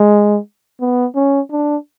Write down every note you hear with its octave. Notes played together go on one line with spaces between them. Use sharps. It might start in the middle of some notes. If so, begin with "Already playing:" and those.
Already playing: G#3
B3
C#4
D4